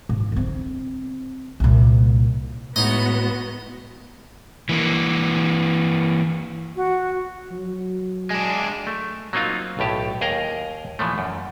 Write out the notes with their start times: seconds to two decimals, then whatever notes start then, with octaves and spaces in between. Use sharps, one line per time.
0.09 G#2
0.32 D3 C4
1.60 C2 A#2
2.76 A2 G#3 B3 D#4 F#4 D#5
4.69 E3 A#3
6.76 F#4
7.51 F#3
8.31 G#3 D4
8.87 A3
9.33 F#3 A#3 C4 D#4 F4 F5
9.79 B1 A2 G4 A5
10.21 D#2 G#4 A#4 D#5 A#5
10.99 A#2 E3 F3 A3
11.18 F#2